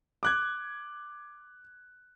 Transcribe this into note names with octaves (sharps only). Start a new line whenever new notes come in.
D6 F#6 G#6